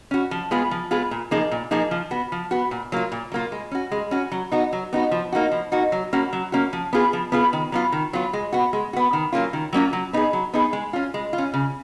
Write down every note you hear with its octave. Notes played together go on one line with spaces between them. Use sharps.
C#4 F#4
F3
G#3 B3 F4 G#4
F3
G#3 B3 F4 G#4
A#2
F3 A#3 D#4 G#4
A#2
F3 A#3 D#4 G#4
F3
B3 F#4
F3
B3 F#4
A#2
F#3 A#3 F4
A#2
F#3 A#3 F4
G#3
C#4 F#4
G#3
C#4 F#4
F#3
B3 D#4 F#4
F#3
B3 D#4 F#4
F3
A#3 D#4 F#4
F3
A#3 D#4 F#4
F#3
A#3 C#4 F#4
F#3
A#3 C#4 F#4
F3
B3 F4 G#4
F3
B3 F4 G#4
D#3
F#3 B3 F4
D#3
F#3 B3 F4
G#3
B3 F#4
G#3
B3 F#4
D#3
F#3 A#3 C#4 F4
D#3
F#3 A#3 C#4 F4
F#3
B3 D#4 G#4
F#3
B3 D#4 G#4
G#3
C#4 F4
G#3
F4
C#4
C#3